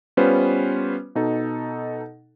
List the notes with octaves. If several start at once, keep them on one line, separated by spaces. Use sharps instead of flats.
G3 B3 C#4 F4 B4 C5
B2 D#4 A4